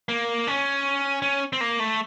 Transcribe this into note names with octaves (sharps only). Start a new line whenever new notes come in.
A#3
C#4
C#4
C4
A#3
A3